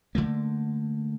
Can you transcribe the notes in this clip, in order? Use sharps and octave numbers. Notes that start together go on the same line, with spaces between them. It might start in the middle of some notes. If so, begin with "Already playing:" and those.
D3 F#3 A3 A#3